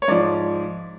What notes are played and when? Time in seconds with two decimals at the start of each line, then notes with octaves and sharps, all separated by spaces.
0.02 C#5
0.08 G#2 F3 D5